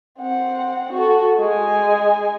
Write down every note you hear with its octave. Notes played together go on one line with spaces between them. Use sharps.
C4 F#5
F#4 A4
G#3 G#5